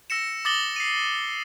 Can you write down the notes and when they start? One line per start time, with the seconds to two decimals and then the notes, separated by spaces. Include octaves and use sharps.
0.10 E6 A#6 C#7 E7
0.45 D6 D#6 A6 A#6 F#7 G7
0.76 C7 D#7